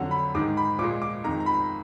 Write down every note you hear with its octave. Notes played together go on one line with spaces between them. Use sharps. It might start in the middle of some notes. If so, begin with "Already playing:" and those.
Already playing: F2 D3 F#3 F#5
B5
G#2 D#3 G#3 D6
B5
A#2 F3 G#3 D6
D6
F2 D#3 G#3 A#5
A#5
B5